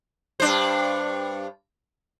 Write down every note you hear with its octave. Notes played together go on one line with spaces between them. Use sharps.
G2 D4 C5